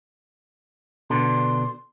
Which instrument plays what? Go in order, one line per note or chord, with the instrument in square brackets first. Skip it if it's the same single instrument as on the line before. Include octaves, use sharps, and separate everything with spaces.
[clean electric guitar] B2 D3 D4 [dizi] C6